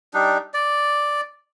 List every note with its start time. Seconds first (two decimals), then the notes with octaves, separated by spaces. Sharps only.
0.14 G3 D4 D#4
0.54 D5